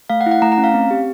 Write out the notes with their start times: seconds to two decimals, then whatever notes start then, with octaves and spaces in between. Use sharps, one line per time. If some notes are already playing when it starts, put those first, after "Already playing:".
0.10 A3 F5
0.21 F#5
0.26 E4
0.31 F#5
0.42 A3 A#5
0.52 A#5
0.58 C#4
0.64 F5
0.74 C4
0.91 G4